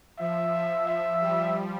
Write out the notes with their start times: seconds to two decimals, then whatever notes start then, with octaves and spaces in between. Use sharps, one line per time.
0.19 F3 E5
0.53 F3
0.87 F3 E5
1.21 G3